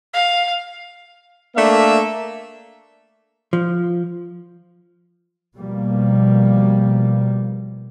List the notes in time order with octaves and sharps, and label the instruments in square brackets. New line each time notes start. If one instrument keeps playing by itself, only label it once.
[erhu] F5
[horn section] A3 A#3 D4 E5
[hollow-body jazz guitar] F3
[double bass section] B2 F3 G3 A#3